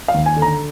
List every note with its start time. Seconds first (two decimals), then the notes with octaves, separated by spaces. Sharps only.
0.08 F5
0.14 D#2
0.26 G#5
0.36 D3
0.42 A#5